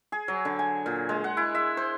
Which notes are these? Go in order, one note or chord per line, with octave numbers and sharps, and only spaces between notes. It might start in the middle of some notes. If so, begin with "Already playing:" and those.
G#4
F#3
D3
G#5
A#2
G#3
F#5
E4
E5
C5